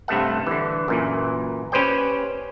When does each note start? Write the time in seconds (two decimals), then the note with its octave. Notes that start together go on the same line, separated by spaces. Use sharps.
0.08 G2 C3 A3 A4 E5 F#5
0.47 D3 E3
0.88 F#2 A#2 E3
1.72 C#4 G4 B4 C5 D5 G5